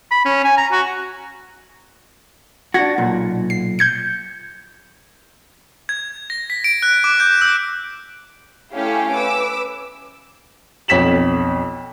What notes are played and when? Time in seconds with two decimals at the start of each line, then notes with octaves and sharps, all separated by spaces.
0.11 B5
0.25 C#4
0.45 G#5
0.58 A#5
0.72 F#4
2.74 D4 F#4 G#6 A#6
2.98 B1 A#2
3.50 C7
3.79 G6 G#6 C#7
5.89 G#6
6.30 A#6
6.50 B6
6.64 D7
6.83 F#6
7.04 D6
7.20 G6
7.42 E6
8.73 A3 C#4 E4 G4 F5
9.13 B4 D6 E6
10.88 B1 F2 C#5 B6 E7 F#7